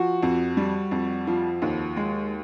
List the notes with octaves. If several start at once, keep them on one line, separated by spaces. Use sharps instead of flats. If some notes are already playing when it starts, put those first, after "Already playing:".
Already playing: F3 F#4
F2
G3
F2
F3
D#2
G#3